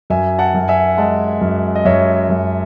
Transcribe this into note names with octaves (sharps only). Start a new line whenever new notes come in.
F#2 E5 G#5
F#5 A5
F#2
E5 G#5
G#3 F#5 A5
F#2
D#5
F#2 C#5 E5
F#2